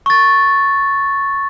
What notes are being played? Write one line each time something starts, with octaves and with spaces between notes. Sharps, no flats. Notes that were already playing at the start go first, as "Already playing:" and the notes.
C#6 A6